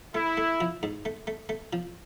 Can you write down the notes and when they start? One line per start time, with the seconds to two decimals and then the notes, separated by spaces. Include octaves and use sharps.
0.14 A3 E4
0.37 A3
0.61 F3
0.83 G#2
1.05 A3
1.27 A3
1.49 A3
1.73 F3